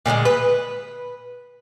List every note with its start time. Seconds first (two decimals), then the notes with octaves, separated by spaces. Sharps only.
0.06 A#2 D3 F#3 G#3
0.25 B4